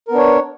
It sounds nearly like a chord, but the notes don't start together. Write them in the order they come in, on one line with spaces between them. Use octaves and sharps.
A#4 B3 D4 C#5